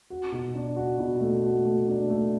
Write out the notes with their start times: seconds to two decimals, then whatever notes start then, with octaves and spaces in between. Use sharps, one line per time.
0.10 F#4
0.32 B2
0.55 D4
0.76 F#4
0.99 B2
1.21 A3
1.44 F#4
1.65 A3
1.87 D4
2.10 A3